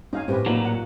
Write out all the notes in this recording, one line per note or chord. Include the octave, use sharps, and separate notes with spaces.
C#4 D#4 F5 G#5
A2 C4 G4 B4
A#2 F#3 A#3 D#4
F#5